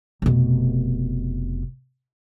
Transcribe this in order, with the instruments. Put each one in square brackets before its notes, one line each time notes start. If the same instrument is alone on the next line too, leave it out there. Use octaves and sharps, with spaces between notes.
[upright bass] F1 B2